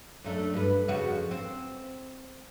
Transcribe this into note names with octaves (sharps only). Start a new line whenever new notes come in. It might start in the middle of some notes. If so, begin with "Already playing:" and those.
F#2 A3 D4
G2 B4
F2 C#3 F#4
C4